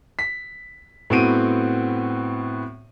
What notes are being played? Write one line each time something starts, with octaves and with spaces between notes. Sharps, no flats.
B6
A2 B3 C4 F#4 D7 D#7